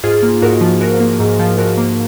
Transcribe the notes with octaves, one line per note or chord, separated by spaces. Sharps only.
G#2 F4 G#4
A#3
G#2 F#4 A#4
F3
G#2 F#4 A#4
A#3
G#2
F3
G#2 F#4 A#4
A#3